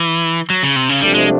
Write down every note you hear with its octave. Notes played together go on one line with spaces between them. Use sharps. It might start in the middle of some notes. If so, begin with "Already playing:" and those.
Already playing: E3
F#3
C#3
C3
C#3
C3 F3 G3 A3 D4
G#3